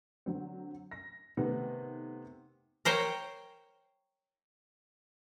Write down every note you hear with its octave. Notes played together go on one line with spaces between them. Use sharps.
D3 F#3 C4
A#6
C3 D#3 A3 B3
A#4 C5 C#5 G5 A#5